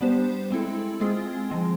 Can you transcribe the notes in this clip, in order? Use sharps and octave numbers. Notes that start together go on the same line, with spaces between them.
G3 B3 D4 G4 C5
G#3 C4 E4 A4
G#3 C4 F4 G#4
F3 G#3 C4